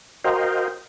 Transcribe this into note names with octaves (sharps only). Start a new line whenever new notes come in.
F#4 A#4 C5 D#5 F5 G5